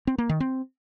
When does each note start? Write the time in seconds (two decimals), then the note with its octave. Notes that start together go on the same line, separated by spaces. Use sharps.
0.07 C4
0.18 A#3
0.29 D#3
0.40 C4